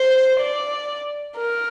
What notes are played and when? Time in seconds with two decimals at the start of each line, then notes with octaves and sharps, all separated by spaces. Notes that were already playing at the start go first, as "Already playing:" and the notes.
Already playing: C5
0.40 D5
1.37 A#4